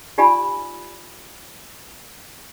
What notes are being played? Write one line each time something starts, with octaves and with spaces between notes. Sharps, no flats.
D#4 F4 G4 D5 G#5 B5